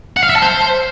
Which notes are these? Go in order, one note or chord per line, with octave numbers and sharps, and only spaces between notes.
F#5
F5
E5
A5
C5